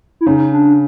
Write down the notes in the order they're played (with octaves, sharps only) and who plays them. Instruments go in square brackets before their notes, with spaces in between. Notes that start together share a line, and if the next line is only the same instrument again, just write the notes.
[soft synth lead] E4
[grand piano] C#3 [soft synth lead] D#4
[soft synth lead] D4